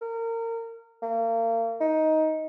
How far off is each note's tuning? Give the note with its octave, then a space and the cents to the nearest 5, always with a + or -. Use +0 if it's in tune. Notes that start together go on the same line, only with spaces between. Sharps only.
A#4 -30
A#3 -35
D#4 +10